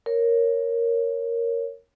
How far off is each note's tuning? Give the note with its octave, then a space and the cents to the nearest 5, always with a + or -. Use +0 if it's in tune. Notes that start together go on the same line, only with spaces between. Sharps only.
A#4 +0 C#5 +0